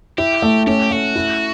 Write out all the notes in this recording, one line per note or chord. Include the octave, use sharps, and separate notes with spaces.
E4 G4
A3
C#4 G4
A3 F#4
E4